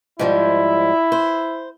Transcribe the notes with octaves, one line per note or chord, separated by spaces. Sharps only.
G#2 F3 G3 E4
C5